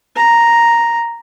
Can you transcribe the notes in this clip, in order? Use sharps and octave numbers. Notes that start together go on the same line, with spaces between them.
A#5